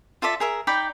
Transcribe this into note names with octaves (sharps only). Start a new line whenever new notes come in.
F4 A4 D5 E5
G#4 A#4 E5
D#4 D5 G5 B5